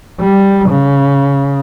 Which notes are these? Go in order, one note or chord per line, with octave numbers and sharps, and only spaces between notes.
G3
C#3